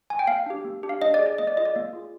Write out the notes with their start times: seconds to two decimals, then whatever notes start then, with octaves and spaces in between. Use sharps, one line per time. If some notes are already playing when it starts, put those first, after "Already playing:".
0.10 G#5
0.19 G5
0.27 A#3 F5
0.46 D4 G4
0.65 A#3
0.83 D4 G4
0.89 F5
1.02 D4 D#5
1.14 D5
1.19 G#4
1.26 D5
1.38 A#3 D#5
1.47 D5
1.57 F4 G#4 D#5
1.65 D5
1.75 A#3 D5
1.93 F4 G#4